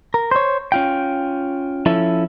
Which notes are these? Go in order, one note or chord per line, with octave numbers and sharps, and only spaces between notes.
A#4
C5 C#5
C#4 F4 G5
F3 C#4 E4 A4